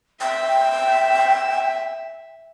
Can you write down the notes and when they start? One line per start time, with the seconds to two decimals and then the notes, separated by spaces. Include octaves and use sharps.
0.21 E5 G5